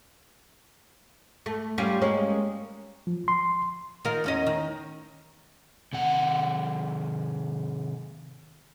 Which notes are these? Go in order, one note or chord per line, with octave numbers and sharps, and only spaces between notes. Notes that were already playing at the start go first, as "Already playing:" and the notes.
A3
G3 C#4 F4
G#3 A#3 C#4
F3
C6
D#3 F4 A#4
E2 C#4 D#5
D#3
C3 D#3 F#5